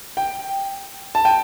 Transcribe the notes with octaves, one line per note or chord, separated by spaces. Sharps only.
G5
A5
G5